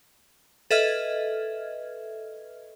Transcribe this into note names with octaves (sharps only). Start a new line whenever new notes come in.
A4 B4 D#5 E5 F6 G#6